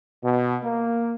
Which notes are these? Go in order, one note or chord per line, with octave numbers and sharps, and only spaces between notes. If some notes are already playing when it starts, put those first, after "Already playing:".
B2
A#3